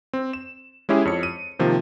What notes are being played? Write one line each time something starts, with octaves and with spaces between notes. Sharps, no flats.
C4
E7
G#3 C#4 E4 G4 G#4
F2 C#5 C#7
D#7
C3 D#3 F3 A#3